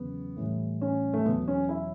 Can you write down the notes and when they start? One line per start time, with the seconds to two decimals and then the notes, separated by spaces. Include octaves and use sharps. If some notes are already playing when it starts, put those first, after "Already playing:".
Already playing: E2 C#3 F#3 B3
0.37 A2 E3 G3
0.81 C#4
1.14 A3
1.25 E2 B2 F#3 B3
1.48 C#4
1.69 E4